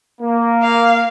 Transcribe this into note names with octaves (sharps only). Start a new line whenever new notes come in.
A#3
F5